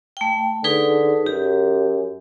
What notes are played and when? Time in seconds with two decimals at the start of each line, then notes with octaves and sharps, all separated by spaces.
0.17 A3 G5
0.64 D3 D#4 G#4 B4
1.26 F#2 G4